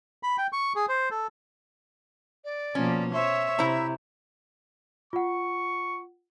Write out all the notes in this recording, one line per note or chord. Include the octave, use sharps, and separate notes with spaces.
B5
G5
C#6
G#4
C5
A4
D5
B2 F3 A#3 C#4
C5 C#5 E5
C3 E4 C5 A#5
F4 F#5 C#6